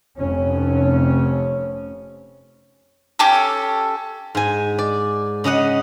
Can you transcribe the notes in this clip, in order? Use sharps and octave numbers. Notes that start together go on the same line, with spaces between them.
F1 F2 C#4
C#4 G4 A4
G#2 G#5
D5
C#3 C#4 D#5 F#5